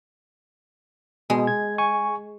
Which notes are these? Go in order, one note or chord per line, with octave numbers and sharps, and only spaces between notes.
B2 G#3
G#6
G#5 C#6